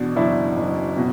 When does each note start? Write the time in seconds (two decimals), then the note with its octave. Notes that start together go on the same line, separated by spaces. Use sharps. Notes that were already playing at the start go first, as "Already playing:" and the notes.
Already playing: E2 B2 D4
0.16 F#1 D4 E4
0.57 F#1
0.97 B2